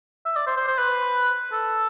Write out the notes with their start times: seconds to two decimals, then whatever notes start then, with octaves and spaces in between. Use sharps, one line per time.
0.26 E5
0.36 D5
0.47 C5
0.57 C5
0.67 C5
0.78 B4
1.52 A4